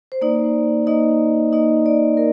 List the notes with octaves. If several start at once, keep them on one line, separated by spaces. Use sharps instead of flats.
C5
A#3 D#4 D5
A#3 D#4 D#5
A#3 D#4 D#5
D5
A#4